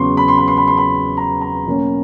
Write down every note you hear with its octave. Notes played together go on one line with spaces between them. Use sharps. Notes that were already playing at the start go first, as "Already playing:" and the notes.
Already playing: E2 C#3 F#3 B3 C6 C#6
B5
C6
B5
C6
B5
C6
B5
A#5
A#5
B2 F#3 A#3 C#4